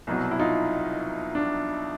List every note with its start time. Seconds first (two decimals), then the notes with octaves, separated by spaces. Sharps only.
0.07 C2 B2 F#3
0.31 E4
0.39 D#4 F4
1.35 D4